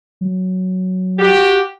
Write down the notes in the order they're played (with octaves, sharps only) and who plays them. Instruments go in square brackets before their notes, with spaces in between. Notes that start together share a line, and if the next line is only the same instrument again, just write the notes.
[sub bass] F#3
[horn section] F#4 G4